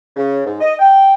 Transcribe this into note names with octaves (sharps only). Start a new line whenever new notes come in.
C#3
G#2
D#5
G5